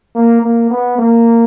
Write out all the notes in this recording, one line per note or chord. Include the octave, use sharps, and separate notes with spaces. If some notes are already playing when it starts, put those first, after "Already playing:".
A#3
A#3
B3
A#3